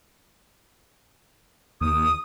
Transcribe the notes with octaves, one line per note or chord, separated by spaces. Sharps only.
D#2 D#6